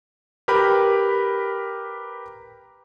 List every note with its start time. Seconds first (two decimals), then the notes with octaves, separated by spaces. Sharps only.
0.48 G4 A#4 B4 G5 B5